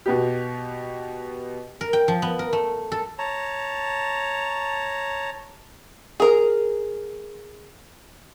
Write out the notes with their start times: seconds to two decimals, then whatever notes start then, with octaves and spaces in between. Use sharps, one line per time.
0.06 B2 B3 G4
1.81 A#4
1.93 G5
2.08 F3
2.22 B3
2.39 A#4
2.53 A3
2.92 A4
3.19 C#5 A5 A#5
6.20 G#4 A#4